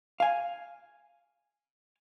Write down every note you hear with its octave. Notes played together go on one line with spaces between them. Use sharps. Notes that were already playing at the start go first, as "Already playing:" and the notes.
F5 G#5